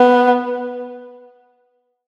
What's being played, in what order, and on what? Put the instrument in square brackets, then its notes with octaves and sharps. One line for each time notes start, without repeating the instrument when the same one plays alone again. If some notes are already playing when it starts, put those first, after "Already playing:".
Already playing: [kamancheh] B3